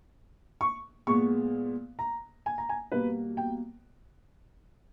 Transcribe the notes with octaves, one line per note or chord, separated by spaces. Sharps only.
C#6
A#2 G#3 B3 C#6
A#5
G#5
A#5
G#5
B2 G3 A#3 B4
G5